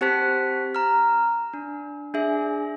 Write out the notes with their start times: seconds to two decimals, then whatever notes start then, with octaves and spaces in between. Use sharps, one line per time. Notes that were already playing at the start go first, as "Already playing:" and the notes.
0.01 C4 G4 C5 A5 F#6 B6
0.75 A#5 F6
1.54 D4
2.14 D4 G#4 E5